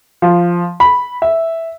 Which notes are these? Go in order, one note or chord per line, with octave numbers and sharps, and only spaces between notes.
F3
B5
E5